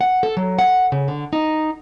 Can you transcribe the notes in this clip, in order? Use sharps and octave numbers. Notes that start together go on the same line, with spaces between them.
F#5
A4
F#3
F#5
C#3
D3
D#4